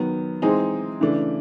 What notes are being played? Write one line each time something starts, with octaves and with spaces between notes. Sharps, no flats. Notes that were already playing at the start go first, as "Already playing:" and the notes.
Already playing: D#3 F#3 B3
E3 G#3 C4 D#4 G#4
C#3 E3 A3 D4